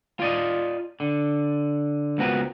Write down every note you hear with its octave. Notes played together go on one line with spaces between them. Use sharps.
F4 D5 D#5
D3
C#2 B3 C4 F#4 A#4 B4